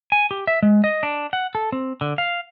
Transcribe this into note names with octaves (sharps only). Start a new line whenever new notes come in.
G#5
G4
E5
G#3
D#5
D4
F#5
A4
C4
D3
F5